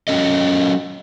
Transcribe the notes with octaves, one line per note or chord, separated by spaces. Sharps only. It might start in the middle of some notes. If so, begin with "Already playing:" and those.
F#3 C#4 A4 D#5